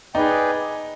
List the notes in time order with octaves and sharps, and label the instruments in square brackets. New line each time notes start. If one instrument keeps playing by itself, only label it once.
[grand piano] D#4 [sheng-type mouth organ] G#4 B4 D5 G5